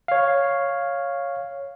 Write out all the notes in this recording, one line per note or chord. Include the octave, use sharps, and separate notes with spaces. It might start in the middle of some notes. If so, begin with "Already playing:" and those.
C#5 F5